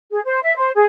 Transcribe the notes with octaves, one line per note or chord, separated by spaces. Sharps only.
G#4
C5
E5
C5
G#4